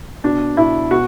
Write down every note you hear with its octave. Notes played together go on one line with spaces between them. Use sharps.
B2 D4
B2 E4
B2 F#4